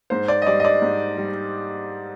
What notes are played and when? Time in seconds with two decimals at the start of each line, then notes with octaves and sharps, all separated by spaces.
0.10 G#2 C5
0.28 D5
0.42 D#5
0.47 G3 D5
0.60 D#5
0.65 D5
0.82 G#2
1.18 G3